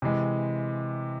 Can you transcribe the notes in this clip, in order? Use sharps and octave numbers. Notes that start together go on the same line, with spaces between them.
C3 E3 G#3